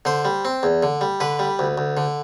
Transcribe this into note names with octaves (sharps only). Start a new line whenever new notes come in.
D3 C5
G3
C4
E2
D3
G3
D3 B4
G3
D2
D2
D3